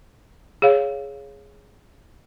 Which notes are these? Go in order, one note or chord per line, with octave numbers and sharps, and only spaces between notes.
G#4 C#5 F5